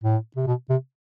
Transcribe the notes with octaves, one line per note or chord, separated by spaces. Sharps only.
A2
C3
B2
C3